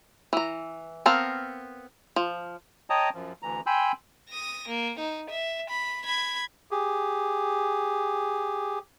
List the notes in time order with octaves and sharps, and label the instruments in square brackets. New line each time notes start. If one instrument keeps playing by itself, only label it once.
[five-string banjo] E3 A#5
B3 C4 A#4 F5 A5
F3
[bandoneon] C#5 D#5 G5 A5 A#5 D#6
F#2 F3
D2 E3 A#5
G5 G#5 B5 C6 E6 G6
[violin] D#6 A#6
A#3
D#4
E5
B5
B5 G#6
[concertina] G4 G#4